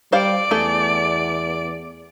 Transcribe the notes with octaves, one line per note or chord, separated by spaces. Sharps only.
G3 C5 D5 F5 D7
E2 A3 G#4 A4